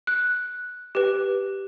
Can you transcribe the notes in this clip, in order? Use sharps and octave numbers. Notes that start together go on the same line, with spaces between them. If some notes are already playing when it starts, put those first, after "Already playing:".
F#6
G4 B4